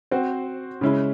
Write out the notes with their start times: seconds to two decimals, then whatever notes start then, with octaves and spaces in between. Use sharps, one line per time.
0.11 C4 F#4 C5
0.81 C#3 G#3 C#4 E4